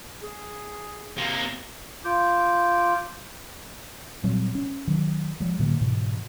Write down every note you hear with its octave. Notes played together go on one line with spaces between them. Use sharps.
G#4
C3 A#3
F4 D6 G6
A#2 F#3 G3 C4
C#4
D#3 F#3
F3 G#3
A2 D3 F#3 A#3
G#2 B2 E3